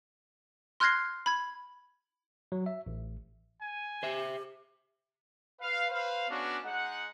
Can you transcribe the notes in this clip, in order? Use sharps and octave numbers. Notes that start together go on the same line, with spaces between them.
C6 F6 F#6 G#6 A#6 C7
B5 G#6
F#3
E5
A1
G#5
G4 C5 E5
B4 F5
B4 C5 F5
G#3 B3 C#4 D4 F#4
G#3 D#4 F#5